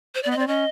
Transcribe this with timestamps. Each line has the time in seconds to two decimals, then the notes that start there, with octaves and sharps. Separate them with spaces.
0.15 C5
0.23 D5
0.26 B3
0.31 D#5
0.36 C4 D5
0.48 C#4 D#5